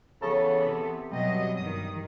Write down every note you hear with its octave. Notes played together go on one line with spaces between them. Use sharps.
C#3 E3 B3 A4
C3
B2 F#3 G3 D#5
G2 D#3 D#6